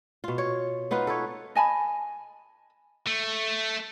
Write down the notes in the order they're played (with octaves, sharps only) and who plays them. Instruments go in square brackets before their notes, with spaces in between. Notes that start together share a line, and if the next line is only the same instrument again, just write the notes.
[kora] B2 F4
C#5
B3 D#4 F4 B4
A4 B4 C#5
[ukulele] D#5 G#5 A5 B5
[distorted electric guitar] A3